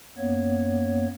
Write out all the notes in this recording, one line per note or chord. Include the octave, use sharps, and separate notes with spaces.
F#2 A#3 B3 C#5